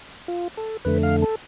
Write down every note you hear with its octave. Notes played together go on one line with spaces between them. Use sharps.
F4
A4
F2 D3 A3 B4
F5
A4